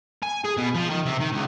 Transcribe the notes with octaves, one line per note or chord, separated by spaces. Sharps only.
G#5
G#4
B2
F3
D#3
C3
D#3
C#2